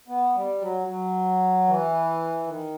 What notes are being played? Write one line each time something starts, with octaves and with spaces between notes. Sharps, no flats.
B3
G3
F#3
F#3
E3
D#3